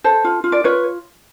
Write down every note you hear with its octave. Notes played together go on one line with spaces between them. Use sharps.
A4 C5
F4
F4
D5
F4 B4 C#5